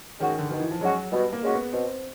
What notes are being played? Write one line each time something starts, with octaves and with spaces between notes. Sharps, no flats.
D#3 G#3 C#4 F#4
D3
B2 D#3
E3
F3
F#3 G#3 C#4 F#4
B2 G3
A#3
G#3 C#4 F#4
B3
B2 C4